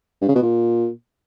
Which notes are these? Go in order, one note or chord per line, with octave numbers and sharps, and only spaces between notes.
G2
C#3
B2
A#2